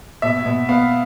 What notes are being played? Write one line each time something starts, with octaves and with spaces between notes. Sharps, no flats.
B2 E5
B2
B3 F5